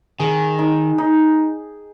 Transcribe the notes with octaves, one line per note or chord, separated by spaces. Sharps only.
D#3 G#4
D#4
D#4